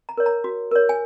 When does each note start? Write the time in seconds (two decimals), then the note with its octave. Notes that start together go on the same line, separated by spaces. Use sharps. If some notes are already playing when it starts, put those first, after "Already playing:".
0.09 A#5
0.18 A#4 C#5
0.26 A#5
0.44 F#4
0.71 A#4 C#5
0.89 G#5